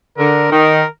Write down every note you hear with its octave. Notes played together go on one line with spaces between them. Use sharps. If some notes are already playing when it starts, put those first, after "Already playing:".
D3 A#4
D#3 A#4